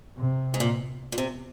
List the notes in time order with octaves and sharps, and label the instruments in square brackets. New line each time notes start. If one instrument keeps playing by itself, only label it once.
[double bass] C3
[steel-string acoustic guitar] G#2
A#2
A#2
C3